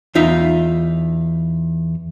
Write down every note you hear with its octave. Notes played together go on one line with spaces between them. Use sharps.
E2 D#4 F4 E5